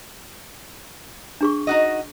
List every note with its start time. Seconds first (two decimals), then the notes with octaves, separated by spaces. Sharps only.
1.41 D4 G#4 C#6
1.67 D#4 F#4 D#5